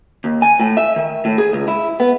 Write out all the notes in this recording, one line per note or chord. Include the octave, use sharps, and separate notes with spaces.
D#2
G#5
A2
E5
D#3
A2
G#4
C#2
E4
B3